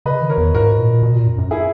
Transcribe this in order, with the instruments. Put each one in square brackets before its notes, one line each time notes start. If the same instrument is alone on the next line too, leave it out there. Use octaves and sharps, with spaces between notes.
[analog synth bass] C#3 [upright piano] B4 D#5
[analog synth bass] D#3
[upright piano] A#4 C#5
[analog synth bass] E2
[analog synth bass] G#2 [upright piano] F#4 A#4
[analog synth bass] A#2
B2
A#2
F#2
F#2
[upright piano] E4 G#4